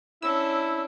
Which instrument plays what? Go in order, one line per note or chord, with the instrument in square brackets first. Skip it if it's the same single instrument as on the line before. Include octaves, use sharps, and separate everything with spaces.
[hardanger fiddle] C#4 D4 [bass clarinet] E4 [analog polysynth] E6